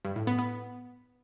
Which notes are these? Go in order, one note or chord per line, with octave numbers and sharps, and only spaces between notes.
G2
A2
B3
B3